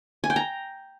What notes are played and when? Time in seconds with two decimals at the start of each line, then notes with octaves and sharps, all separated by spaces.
0.24 G#5
0.30 G5
0.36 A#5